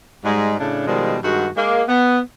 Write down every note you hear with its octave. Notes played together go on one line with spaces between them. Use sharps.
G#2 G3 G#3
A2 C#3 D4
B2 D#3 F3 G3 G#3
G2 D#3 G#3 F#4
G#3 A#3
B3